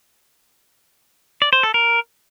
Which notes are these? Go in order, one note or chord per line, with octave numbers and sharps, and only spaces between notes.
D5
C5
A4
A#4